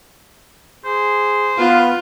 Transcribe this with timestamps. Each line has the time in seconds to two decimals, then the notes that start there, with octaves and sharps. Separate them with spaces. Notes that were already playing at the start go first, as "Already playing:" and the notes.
0.85 G#4 C5
1.58 B3 F4 B4 F5